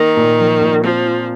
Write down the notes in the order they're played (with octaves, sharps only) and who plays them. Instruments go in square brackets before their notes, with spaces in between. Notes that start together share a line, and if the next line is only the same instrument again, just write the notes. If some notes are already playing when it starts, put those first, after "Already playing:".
Already playing: [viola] D#3 [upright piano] A#3
[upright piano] A#2
F3
A#2
[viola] F3 [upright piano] C4
[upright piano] F4